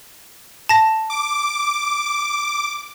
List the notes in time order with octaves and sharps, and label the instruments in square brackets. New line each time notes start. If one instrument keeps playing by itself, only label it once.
[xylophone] A5 A#6
[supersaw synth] D6